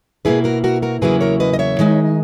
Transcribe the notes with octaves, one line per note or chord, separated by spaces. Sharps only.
B2 A#3 C#4 E4 G#4 B4
F#4 A#4
F#4 A#4
F#4 A#4
E2 C#3 F#3 A#3 E4 G#4 B4
A#4 C#5
B4 D#5
D#5
C#5 E5
D#3 G#3 D#4